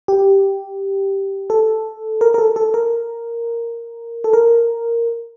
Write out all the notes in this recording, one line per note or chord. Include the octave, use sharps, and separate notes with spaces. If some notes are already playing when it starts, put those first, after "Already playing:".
G4
A4
A#4
A#4
A4
A4
A#4
A4
A#4